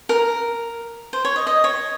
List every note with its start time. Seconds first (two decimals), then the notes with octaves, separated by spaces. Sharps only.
0.09 A#4
1.13 C5
1.25 C#5
1.36 D#5
1.47 D#5
1.64 C#5